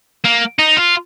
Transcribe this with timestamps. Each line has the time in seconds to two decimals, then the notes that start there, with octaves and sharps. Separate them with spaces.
0.24 A#3
0.59 D#4
0.76 F4